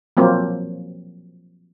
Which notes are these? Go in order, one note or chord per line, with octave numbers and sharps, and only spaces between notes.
F3 F#3 A#3 C4